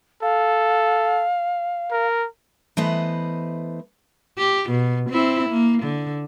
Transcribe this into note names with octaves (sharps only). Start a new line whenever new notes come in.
A4 F5
A#4
E3 A3 B3 B4 C5 D#5
G4
B2
C4 E4
A#3
D3